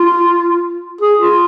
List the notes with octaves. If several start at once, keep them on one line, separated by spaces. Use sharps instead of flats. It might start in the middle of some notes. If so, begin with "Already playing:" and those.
Already playing: F4
G#4
F4